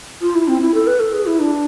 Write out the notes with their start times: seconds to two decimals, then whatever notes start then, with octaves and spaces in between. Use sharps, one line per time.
0.22 F4
0.35 E4
0.48 C4
0.61 E4
0.74 A4
0.87 B4
1.00 A4
1.13 G#4
1.26 E4
1.40 D4